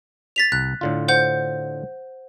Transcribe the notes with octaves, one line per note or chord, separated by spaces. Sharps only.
A6 B6 F7
C2 F#6
A2 D3 F4
C5 F#5 G6